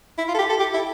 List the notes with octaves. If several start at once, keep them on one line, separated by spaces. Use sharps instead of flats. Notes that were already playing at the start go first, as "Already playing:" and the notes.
E4
F4
A4
G4
A4
G4
E4